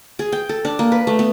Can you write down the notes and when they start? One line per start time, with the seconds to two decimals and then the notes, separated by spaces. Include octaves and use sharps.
0.19 G#4
0.32 G5
0.49 A4
0.65 D4
0.79 A#3
0.92 B4
1.07 A3
1.19 B3